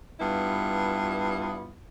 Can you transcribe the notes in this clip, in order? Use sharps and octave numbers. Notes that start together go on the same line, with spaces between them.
G2 B3 E4 F4